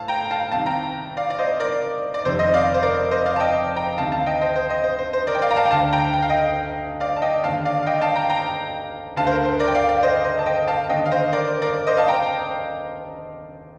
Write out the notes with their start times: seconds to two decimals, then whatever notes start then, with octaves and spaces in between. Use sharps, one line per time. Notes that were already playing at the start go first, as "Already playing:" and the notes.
Already playing: A2 F5 A5
0.08 G5 A#5
0.30 F5 A5
0.52 C2 C3 D#3 F5 A5
0.66 G5 A#5
1.17 D5 F5
1.30 D5
1.39 C5 D#5
1.60 A#4 D5
2.14 D5
2.25 F1 F2 C3 D#3 C5
2.39 C5 D#5
2.54 D5 F5
2.74 C5
2.83 A#4 D5
3.11 C5 D#5
3.26 D5 F5
3.36 A5
3.40 D#5 G5
3.76 G5 A#5
3.97 D2 C3 D#3 F5 A5
4.12 F5 A5
4.26 D#5 G5
4.41 C5 D#5
4.56 C5
4.69 C5 D#5
4.84 C5
4.99 C5
5.13 C5
5.27 A#4 D5
5.35 G5
5.42 D5 F5
5.51 A#5
5.56 F5 A5
5.65 G5
5.70 D2 D3 F5 A5
5.93 G5 A#5
6.14 G5
6.22 F5
6.30 D#5 G5
7.00 D5 F5
7.16 A5
7.22 D#5 G5
7.44 D#2 D3 F5 A5
7.65 D5 F5
7.82 F5
7.86 D#5 G5
8.01 F5 A5
8.16 G5 A#5
8.30 G5 A#5
9.16 D2 D3 F5 A5
9.27 C5
9.31 A#4
9.45 C5
9.59 A#4 D5
9.68 G5
9.75 D5 F5
9.89 D5 F5
9.99 F5
10.03 C5 D#5
10.24 C5 D#5
10.39 A5
10.46 D#5 G5
10.68 F5 A5
10.89 D#2 D3 D#5 G5
11.06 F5
11.11 C5 D#5
11.32 A#4 D5
11.47 C5
11.62 A#4 D5
11.87 C5 D#5
11.97 F5 A5
12.08 G5 A#5